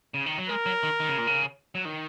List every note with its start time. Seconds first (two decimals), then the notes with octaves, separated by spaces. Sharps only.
0.14 C#3
0.26 D#3
0.38 F#3
0.49 G#3 A#4
0.66 F#3
0.83 D#3
1.00 D#3
1.09 C#3
1.18 A#2
1.27 C#3
1.75 F#3
1.85 D#3